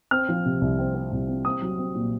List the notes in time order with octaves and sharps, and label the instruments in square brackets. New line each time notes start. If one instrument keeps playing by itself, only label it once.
[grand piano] C4 F6
F3
C3
C2
C4
C4
C2
C4
C4 D#6
F#3
C4
A#2